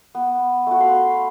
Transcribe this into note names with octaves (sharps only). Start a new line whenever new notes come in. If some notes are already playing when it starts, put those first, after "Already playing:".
B3
A3 F#4
F5 B5 C6